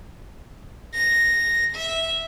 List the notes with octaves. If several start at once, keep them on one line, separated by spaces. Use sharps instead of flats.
A#6
E5